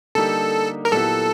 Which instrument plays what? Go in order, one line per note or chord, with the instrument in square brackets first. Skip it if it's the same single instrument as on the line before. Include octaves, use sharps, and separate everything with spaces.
[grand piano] D3 G3 A#3 D#4 G4 [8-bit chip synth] A4
[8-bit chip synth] A#4
[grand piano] A#2 F#3 B3 E4 G4 [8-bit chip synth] A4